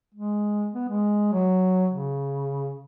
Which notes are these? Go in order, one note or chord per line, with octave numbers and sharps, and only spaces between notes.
G#3
B3
G#3
F#3
C#3